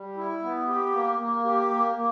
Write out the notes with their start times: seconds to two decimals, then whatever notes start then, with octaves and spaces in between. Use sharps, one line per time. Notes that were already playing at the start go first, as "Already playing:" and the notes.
Already playing: G3
0.17 E4
0.42 B3
0.68 G4
0.93 A#3
1.19 A#3
1.44 G4
1.70 A#3
1.96 A#3